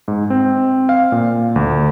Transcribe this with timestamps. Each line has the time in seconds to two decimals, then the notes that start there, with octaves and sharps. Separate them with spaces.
0.08 G#2
0.30 C4
0.89 F5
1.12 A#2
1.56 D2